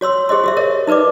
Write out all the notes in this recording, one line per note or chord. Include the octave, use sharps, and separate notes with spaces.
F#4 C#5 C6 E6
G4 G#4 C5 D#5 C6
F#4 G4 E5
A#4 C#5 D#5
D#4 A#4 B4 D5 D6